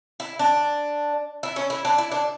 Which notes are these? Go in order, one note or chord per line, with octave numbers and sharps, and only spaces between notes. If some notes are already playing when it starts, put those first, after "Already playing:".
E4
D4
E4
C#4
E4
D4
E4
D4